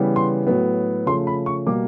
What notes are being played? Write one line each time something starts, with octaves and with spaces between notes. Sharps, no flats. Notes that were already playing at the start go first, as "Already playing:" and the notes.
Already playing: C#3 E3 G3 B3
C6
A2 F#3 B3
C#3 F3 A3 C6
B5
C#6
B2 G3 A#3 D6